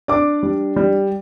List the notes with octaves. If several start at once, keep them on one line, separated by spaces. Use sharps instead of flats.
D4 D5 D6
G3
G3